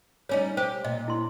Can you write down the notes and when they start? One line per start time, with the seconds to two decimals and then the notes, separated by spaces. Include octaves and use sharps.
0.29 G3 C#4 D#4 C#5
0.57 G4 C5
0.84 A#2 D#5
1.08 E4 C6